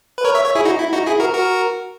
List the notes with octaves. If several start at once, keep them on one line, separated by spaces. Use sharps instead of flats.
B4
A#4 C#5
C#5 E5
C#5 E5
E4 G#4
D#4 F#4
E4
D#4 F#4
E4 G#4
F#4 A#4
F#4 A#4